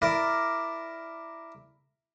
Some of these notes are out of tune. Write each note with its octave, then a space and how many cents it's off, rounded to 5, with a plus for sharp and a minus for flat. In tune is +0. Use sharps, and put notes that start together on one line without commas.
E4 +0 A#4 +0 D5 +5